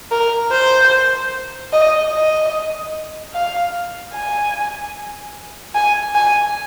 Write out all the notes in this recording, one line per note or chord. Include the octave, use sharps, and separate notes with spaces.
A#4
C5
D#5
D#5
F5
G#5
G#5
G#5